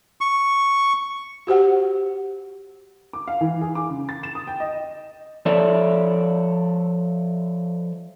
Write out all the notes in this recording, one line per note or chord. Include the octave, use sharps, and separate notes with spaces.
C#6
F#4 G4 C5 F#5
D6
F5
E3
G#4
D6
C#3
A6
E7
D#6
G5
D#5
F3 A4 C#5 D5 E5